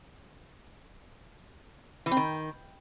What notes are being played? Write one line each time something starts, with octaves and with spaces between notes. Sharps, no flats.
E3
C4
D#3